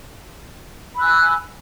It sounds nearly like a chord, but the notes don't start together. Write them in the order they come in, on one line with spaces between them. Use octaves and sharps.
B5 E6 F#6 G#5